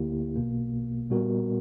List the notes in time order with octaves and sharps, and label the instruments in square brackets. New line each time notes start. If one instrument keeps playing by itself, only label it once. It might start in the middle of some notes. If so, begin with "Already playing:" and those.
Already playing: [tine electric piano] D2 D3 A#3 E4 G4
B1 B2 A#3
A#2 G3 B3 F#4 A#4